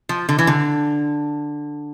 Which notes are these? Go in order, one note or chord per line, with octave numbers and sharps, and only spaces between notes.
F3
D3
E3
D3